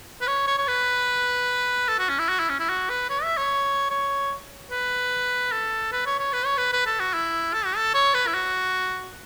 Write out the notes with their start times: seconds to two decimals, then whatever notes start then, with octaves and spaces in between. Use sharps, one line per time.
0.21 B4
0.27 C#5
0.47 C#5
0.58 C#5
0.67 B4
1.88 A4
1.99 F#4
2.09 C#4
2.19 E4
2.29 F#4
2.39 E4
2.49 C#4
2.59 E4
2.69 F#4
2.89 B4
3.09 C#5
3.23 E5
3.37 C#5
3.90 C#5
4.71 B4
5.52 A4
5.92 B4
6.06 C#5
6.19 C#5
6.33 B4
6.45 C#5
6.57 B4
6.73 B4
6.86 A4
6.99 F#4
7.14 E4
7.53 A4
7.65 F#4
7.76 A4
7.94 C#5
8.14 B4
8.27 E4
8.34 F#4